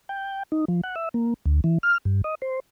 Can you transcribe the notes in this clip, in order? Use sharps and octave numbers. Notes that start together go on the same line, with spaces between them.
G5
D#4
F3
F#5
E5
A#3
D2
E3
F6
G2
D#5
C5